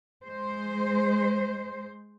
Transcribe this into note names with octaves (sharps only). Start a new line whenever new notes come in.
G#3 C5